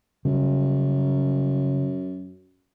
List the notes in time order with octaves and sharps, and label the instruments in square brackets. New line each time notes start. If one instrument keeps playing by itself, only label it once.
[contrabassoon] F#2 [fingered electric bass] C#3 G3